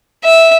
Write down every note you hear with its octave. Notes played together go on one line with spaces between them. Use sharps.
E5